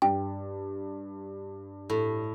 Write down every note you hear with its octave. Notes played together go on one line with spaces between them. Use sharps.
G2 G5
A2